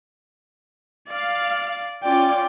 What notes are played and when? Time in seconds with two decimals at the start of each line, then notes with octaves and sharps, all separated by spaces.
1.09 D5 F5
2.04 C#4 F4 D5 G5